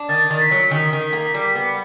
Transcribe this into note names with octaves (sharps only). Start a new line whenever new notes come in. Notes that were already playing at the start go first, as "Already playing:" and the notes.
Already playing: D4
D#3 A6
D#3
B6
F#3
D#3 B6
D#3
A#3
G3
B3